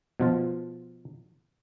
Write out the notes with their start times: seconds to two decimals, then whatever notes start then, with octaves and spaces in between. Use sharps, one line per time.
0.20 B2 F3 F4